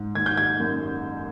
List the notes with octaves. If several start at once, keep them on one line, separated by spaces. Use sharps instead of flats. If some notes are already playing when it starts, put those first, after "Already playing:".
Already playing: G#2
D#3 G#6
G6
G#6
F#2